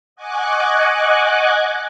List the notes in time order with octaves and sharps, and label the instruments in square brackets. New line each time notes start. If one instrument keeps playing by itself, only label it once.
[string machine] D#5 F#5 G#5 C#6 D6 F#6